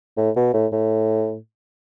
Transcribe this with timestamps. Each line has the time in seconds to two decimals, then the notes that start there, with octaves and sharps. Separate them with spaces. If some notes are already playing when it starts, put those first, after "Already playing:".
0.17 A2
0.36 B2
0.54 A2
0.72 A2